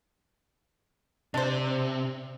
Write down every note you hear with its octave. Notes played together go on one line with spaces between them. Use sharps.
C3 D4 C5